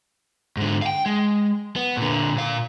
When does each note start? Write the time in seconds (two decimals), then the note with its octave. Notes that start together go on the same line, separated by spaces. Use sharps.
0.57 G#2 D3
0.82 F5 G5
1.06 G#3
1.76 B3
1.97 A#2 D3
2.34 A#2 F5